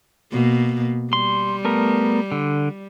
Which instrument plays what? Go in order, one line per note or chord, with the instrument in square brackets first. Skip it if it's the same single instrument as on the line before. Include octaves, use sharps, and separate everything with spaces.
[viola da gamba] B2 A#3
[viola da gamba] G3 [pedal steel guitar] C6
[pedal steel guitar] A3 B3 A#4
D3